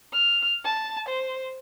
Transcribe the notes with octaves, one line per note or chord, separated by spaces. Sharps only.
F6
A5
C5